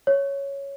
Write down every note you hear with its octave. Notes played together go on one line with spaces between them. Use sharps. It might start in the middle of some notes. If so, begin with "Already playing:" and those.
C#5